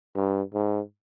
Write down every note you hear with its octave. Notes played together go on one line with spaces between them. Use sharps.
G2
G#2